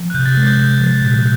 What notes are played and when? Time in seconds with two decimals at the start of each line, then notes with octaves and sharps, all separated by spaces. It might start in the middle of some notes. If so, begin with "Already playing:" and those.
Already playing: F3
0.10 F#6
0.14 C3 G6
0.26 A6
0.37 G#3
0.47 G6
0.58 C3
0.80 F3
1.01 A#2